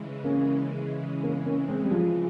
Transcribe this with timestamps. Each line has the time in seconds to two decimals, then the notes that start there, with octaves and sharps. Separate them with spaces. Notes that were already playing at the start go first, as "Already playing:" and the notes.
Already playing: C#3 E3 G#3
0.24 A#3 C#4
1.23 A#3 C#4
1.46 A#3 C#4
1.68 G#3 C4
1.84 G3
1.91 F3 G#3